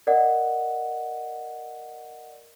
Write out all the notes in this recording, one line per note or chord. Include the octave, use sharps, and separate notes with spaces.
A#4 D5 D#5 F#5